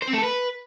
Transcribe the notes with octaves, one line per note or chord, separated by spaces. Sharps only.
C5
C4
A3
A4
B4